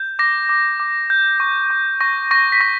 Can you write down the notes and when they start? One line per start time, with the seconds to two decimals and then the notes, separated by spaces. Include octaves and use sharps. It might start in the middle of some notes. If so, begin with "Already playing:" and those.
Already playing: G6
0.19 D6 A#6
0.49 D6
0.80 D6
1.10 G6
1.40 C#6
1.70 C#6
2.01 C#6 A#6
2.31 C#6 A#6
2.52 B6
2.60 C#6 A#6